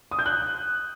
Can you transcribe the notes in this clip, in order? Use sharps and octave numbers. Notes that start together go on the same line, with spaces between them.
D#6
G6
F#6